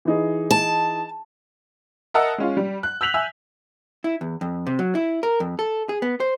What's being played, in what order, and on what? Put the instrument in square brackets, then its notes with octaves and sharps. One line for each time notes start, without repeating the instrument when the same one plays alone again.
[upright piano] E3 D#4 G#4
[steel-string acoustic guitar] A5
[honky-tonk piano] A#4 D#5 E5 F#5 A5 E6
G#3 C#4 F4
G3
F#6
E6 G6 B6 F7 F#7
E5 G#5 E6
[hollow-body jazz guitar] E4
E2
F2
C3
F#3
E4
A#4
F2
A4
G#4
B3
C5